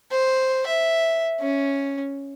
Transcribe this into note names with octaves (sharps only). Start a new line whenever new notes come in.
C5
E5
C#4